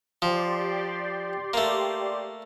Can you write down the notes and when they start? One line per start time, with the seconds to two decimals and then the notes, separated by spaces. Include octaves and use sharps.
0.22 F3 G4 D5 C6
1.54 A3 A#3